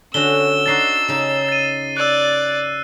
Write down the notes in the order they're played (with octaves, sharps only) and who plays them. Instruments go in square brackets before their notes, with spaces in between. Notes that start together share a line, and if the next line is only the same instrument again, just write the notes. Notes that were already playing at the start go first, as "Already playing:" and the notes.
[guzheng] D3 C#4 F#4 [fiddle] E6 [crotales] G7
[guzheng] D4 D#4 F#4 [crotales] A6 C7
[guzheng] C#3 D#4
[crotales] A6 D#7
[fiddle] D5 [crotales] E6 F#6